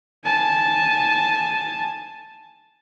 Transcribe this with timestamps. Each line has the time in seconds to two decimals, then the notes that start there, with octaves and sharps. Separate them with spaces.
0.24 G#5 A5